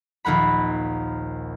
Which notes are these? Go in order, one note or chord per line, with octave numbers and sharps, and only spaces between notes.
A#1 D#2 A#3 F#5 B5